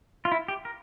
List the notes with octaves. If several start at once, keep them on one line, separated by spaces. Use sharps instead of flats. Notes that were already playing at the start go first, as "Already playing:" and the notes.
F4
E4
G4
A#4